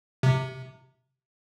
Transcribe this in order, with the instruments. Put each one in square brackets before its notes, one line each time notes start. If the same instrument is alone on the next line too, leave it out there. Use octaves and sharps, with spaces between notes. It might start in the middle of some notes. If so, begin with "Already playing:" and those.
[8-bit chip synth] C3